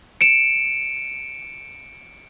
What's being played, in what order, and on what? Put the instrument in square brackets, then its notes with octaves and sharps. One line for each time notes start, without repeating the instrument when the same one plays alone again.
[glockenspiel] C#7 D7 E7